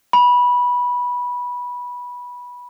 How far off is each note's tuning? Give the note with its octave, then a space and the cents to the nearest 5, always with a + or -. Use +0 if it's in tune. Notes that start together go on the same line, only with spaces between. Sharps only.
B5 -15